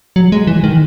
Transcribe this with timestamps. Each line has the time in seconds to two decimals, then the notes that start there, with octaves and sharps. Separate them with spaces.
0.16 F#3
0.32 G#3
0.47 E3
0.64 D#3